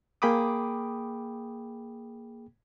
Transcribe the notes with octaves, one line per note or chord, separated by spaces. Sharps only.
A#3 G#4 G5 B5 D6 D#6